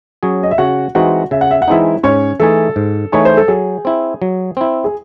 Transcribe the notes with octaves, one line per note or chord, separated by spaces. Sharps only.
F#3 C#4 G#4
D#5
E5
C#3 F#4 F#5
E3 G#3 C4 D#4 F#4 F#5
C#3 E5
F#5
E5
F#5
E3 G#3 C4 D#4 E4 E5
G#2 C#4 C#5
E3 A3 D#4 G#4 A4
G#2
E3 A3 D#4 G#4 C#5
C5
A4
F#3 G#4
C4 E4
F#3
C4 E4
G#4